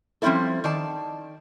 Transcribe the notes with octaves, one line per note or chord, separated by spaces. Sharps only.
F3 G3 C4 C#4 E4 A4
D#3 D5 A5